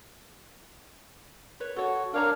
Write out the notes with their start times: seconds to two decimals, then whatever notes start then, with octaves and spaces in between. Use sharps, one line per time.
1.60 B4 C#5
1.76 F#4 A4 C#5
2.14 D4 A#4 C#5 F5 A#5